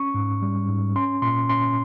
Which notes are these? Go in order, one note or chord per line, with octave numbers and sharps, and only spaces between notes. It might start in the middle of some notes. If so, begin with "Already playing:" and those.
Already playing: C#4 C#6
G#2
G3
G#2
C#4 C6
A#2 C6
C#4 C6